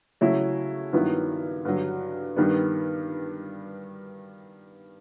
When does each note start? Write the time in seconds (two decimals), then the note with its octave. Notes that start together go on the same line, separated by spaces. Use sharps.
0.21 C#3 F#3 A3 C#4 E4
0.93 G2 D#3 F#3 B3 E4
1.65 G2 D3 F#3
2.36 G2 D#3 G3 B3